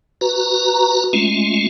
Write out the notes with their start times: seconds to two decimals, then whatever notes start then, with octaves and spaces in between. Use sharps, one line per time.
0.21 F#4 B4 A#5
1.13 G#3 A3 C#4 F4